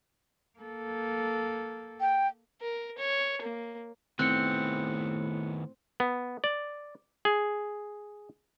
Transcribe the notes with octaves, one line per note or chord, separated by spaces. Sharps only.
A#3 A4
G5
A#4
C#5
A#3
A2 D#3 B3 C4 F#6 C#7
B3
D5
G#4